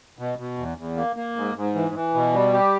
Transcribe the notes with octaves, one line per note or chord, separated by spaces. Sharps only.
B2
B2
E2
E2
A#3
A#3
G#2
G#2
E3
E3
B2
G3
G4